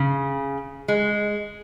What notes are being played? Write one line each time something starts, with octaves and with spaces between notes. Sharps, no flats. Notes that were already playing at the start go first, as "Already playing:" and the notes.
Already playing: C#3
G#3